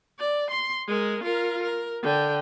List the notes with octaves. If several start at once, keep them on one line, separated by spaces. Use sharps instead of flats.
D5
C6
G#3 A#4
F4 A#4
A#4
D3 G5